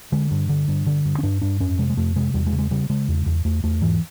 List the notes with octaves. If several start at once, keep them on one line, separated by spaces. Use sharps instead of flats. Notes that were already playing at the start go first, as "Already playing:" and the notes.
D3 G#3
G2
D3
G2
D3
G2
C#4
G2 D4
G2 D4
F2 C#4
C3 G#3
G#3
F2 A3
C3 G#3
E2 G3
G#3
C#3
G#3
C#3 G3
C#3 G#3
E2
E2
E2 A3
E2 A3
G#2 E3